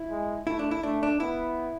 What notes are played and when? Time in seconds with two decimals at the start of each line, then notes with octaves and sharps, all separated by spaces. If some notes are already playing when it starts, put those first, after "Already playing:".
Already playing: E4
0.10 G#3
0.47 A3 E4
0.59 D4
0.71 E4
0.83 A3 D4
1.03 D4
1.20 B3 E4